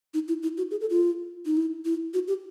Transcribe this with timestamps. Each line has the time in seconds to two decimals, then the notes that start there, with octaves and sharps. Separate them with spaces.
0.14 D#4
0.28 E4
0.43 E4
0.58 F#4
0.71 G#4
0.81 A4
0.90 F4
1.46 D#4
1.57 E4
1.85 E4
2.14 F#4
2.28 G4